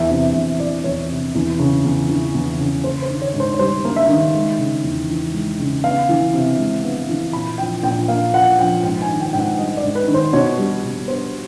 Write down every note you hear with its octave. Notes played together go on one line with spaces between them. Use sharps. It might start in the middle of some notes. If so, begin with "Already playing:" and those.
Already playing: E2 E5
C3
E2
E3 D5
E2 C#5
C3
E2
C#3
E2
E3
E2
C#3
A#3 C5
C5
D#3
C#5
G#2
C5
C#5
G3 C5
A#3
E5
D#3
G#3
C#3
E2
E3
G#3
C#3
B3 F5
E3
C3
G#3
B3
E3
A#2 B5
F3 G5
A#2 G5
A#3 F5
A#2 F#5
F3 G5
G#2 G5
G#5
D#3
G5
G#2 G5
F#5
G3 D#5
D5
G#2
B4
D#3
C5
B2 C#5
G3
B2
B3 C5